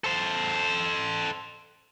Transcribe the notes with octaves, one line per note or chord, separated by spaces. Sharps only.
A4 C5